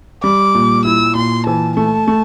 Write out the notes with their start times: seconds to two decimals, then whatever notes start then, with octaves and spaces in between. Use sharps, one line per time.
0.23 G3 D6
0.55 A#2
0.85 E4 E6
1.15 A#2 C6
1.46 E3 A5
1.77 A3 A5
2.08 A3